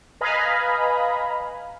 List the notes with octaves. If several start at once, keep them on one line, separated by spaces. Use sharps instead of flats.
B4 D#5 F5 G#5 A#5 B5